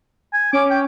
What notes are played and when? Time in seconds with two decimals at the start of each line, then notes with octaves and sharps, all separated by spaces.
0.33 G#5
0.53 C#4 D6
0.70 G5